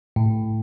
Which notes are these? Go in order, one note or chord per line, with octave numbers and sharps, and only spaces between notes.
A2